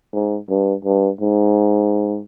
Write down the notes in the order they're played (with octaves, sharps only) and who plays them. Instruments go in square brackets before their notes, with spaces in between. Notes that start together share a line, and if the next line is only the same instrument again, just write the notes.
[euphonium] G#2
G2
G2
G#2